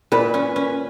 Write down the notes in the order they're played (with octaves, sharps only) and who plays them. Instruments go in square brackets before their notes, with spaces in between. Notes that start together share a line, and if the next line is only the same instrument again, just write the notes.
[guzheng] A#2 [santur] B4
[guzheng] C#4
C#4